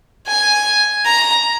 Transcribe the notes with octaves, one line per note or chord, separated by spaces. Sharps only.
G#5
A#5